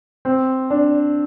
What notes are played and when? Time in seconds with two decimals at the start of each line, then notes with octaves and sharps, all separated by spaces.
0.25 C4
0.70 D4